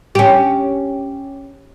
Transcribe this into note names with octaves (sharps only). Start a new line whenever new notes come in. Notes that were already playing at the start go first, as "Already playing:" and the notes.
C#4 G4